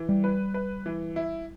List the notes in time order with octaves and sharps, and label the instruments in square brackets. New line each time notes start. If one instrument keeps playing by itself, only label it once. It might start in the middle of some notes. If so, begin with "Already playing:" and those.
Already playing: [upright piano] E3
[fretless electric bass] G3
[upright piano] B4
B4
E3
E4